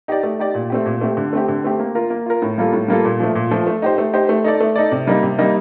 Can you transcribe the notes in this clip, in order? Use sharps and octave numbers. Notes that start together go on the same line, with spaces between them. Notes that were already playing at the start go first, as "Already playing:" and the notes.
D#4 G4 D5
A3
D#4 G4 D5
A#2
A3 C4 G4
A#2
A3 C4 G4
D3
A3 C4 G4
D3
A3 C4 G4
A#3
F4 A#4
A#3
F4 A#4
A2
G3 A#3 F4 A4
A2
G3 A#3 F4 A4
A#2
F3 A3
A#2
F3 A3
A3
D#4 G4 C5
A3
D#4 G4 C5
A3
D#4 A4 D5
A3
D#4 A4 D5
C3
G3 A#3 D#4
C3
G3 A#3 D#4